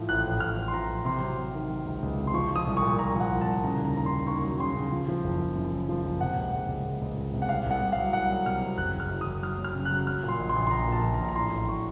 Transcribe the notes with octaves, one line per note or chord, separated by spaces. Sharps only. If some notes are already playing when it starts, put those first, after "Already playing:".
Already playing: A2 F3
A1 F#6
A1
A1 F6
A1
C6
F3 A#5
A1
C3 C6
F#3
C3
D#3
F#3
C#2
C#2
C3
C6
F3 C#6
F3 D#6
C2
C#6
A#2
A#2 A#5
F3 F#5
C2
A5
C2
C#3 A#5
D#2
A#5
D#2 A#5
D#2 C6
D#2 C#6
F#3
C#3 C6
C#3
F3
F3
F#1
F#1
F#2
F#1
F3
F#1
C3 F#5
C#2
C#2 F#5
C#2
C#2
C#2
C#2
C3
F#5
C2 F5
C2 F#5
C2
F5
F#3
C2 F#5
F#3
C3 F6
F#3
F#1 F#6
F#1
F6
F#3
F#1 D#6
F#3 F6
F#3
F6
C#3
F#6
F#3
F#3 F6
A#2
C6
A#1
C6
A#1
C6
A#1 A#5
A#2 A5
A#1
A#5
A#1
A#5
A2 C6
A1
F#3 C#6